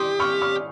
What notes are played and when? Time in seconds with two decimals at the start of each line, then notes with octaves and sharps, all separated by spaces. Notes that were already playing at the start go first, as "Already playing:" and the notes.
Already playing: G4 C6 D#6
0.20 C#6 F6
0.42 C#6 F6